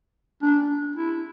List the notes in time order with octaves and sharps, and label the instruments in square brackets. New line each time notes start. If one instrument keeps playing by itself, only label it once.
[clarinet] D4
E4